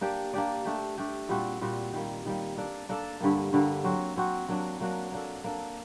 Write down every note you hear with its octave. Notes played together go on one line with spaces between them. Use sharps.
A#3 D4 G4 D5
A#3 D4 G4 D5
A3 D4 G4
A3 D4 G4
A#2 G3 C4 F#4
A#2 G3 C4 F#4
D#3 G3 A#3
D#3 G3 A#3
A#3 D4 A4 D5
A#3 D4 A4 D5
G2 D3 G3 A#3
G2 D3 G3 A#3
F#3 C4 F#4
F#3 C4 F#4
F#3 A#3 D4 F#4
F#3 A#3 D4 F#4
A#3 D4 A4
A#3 D4 A4